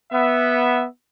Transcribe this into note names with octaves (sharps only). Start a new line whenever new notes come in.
B3 E5